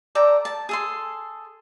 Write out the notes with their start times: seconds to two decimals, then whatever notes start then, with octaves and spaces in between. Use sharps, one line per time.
0.15 A4 D5 G5 A#5
0.45 A5
0.69 G#4 A4 C6